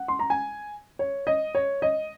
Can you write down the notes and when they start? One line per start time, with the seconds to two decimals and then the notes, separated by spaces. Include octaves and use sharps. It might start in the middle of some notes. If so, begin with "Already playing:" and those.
Already playing: F#5
0.08 C6
0.19 A#5
0.30 G#5
0.99 C#5
1.27 D#5
1.55 C#5
1.82 D#5